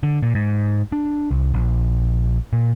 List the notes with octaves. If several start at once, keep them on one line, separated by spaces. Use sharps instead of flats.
D3
A#2
G#2
D4
C2
A#1
A#2